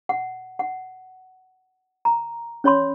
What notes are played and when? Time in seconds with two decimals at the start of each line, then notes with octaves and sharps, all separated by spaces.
0.09 F#5
0.59 F#5
2.05 A#5
2.64 C#4 C#5 B5 C6